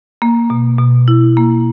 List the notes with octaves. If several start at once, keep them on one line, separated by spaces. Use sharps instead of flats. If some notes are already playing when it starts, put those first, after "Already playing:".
A#3
B2
B2
E4
A#3